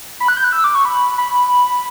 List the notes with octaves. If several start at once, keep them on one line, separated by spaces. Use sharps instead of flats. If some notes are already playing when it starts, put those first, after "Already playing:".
B5
F#6
G6
F#6
E6
D6
C#6
B5
B5